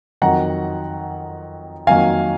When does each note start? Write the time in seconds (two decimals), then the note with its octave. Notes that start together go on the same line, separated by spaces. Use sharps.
0.22 F2 D#3 F#3 F#5 A#5
1.87 F2 D#3 F#3 A#3 F5 G#5